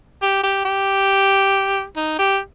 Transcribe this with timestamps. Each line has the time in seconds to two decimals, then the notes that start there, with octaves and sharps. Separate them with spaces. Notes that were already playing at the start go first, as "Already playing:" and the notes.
0.22 G4
0.43 G4
0.65 G4
1.96 D#4
2.19 G4